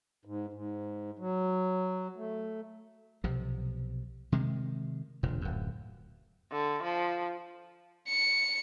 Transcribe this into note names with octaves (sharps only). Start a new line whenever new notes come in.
G#2
G#2
F#3
A3
B1 C3 F3
C3 D#3 G#3
E1 A#2 D3
D1 F#2
D3
F3
C#7